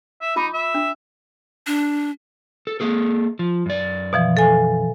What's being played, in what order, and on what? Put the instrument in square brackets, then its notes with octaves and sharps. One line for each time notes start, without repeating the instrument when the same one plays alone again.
[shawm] E5
[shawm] D#4 [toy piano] F4 B5 D6
[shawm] E5
[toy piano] D4
[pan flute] D4
[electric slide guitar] A4
A#3 G#4 A4
F3
F#2 D5
[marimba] B2 E3 F3
A4 G#5